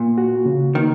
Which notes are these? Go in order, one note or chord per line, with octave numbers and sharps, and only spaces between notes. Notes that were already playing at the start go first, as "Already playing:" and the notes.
Already playing: A#2 A#3
F#4
C#3
D#3 A#3